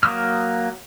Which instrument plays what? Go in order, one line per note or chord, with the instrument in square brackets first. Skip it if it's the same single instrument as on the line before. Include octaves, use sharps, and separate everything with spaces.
[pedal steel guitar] F#3 A#3 D6 D#6 F6